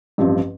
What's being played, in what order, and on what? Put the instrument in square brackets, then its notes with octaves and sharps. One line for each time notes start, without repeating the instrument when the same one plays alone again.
[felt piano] A1 G2 F3 C4